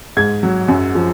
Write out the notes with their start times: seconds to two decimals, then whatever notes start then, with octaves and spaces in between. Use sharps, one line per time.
0.17 G#2 G#6
0.43 F#3
0.68 F#2
0.95 F3